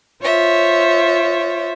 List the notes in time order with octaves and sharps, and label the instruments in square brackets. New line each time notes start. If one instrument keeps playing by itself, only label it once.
[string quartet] F4 C5 C#5 E5